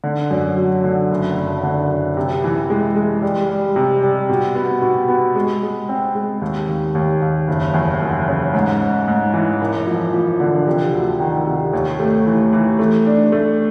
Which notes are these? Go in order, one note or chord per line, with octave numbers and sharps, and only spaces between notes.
D3
F#2
F#3
D3
F#1
F#1
D3
F#1
C3
E3
G#3
G#3
G3
G3
C3
G3
B2
B3
B2
B3
G#3
G#3
C4
G#3
D#2
D#2
D#2
D#2
F#1
E2
F#1
C#3
G#2
G#2
G#2
E3
E1
F3
F3
D3
C3
D2
D#3
C3
D#2
A3
E3
E3
A3
D4
A3